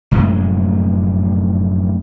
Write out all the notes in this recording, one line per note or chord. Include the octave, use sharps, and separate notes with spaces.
F1 F#2 A2 G#3